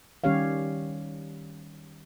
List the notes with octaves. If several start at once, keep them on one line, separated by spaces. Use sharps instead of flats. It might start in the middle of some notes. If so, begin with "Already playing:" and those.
D#3 G3 C#4 G4 C#5 F5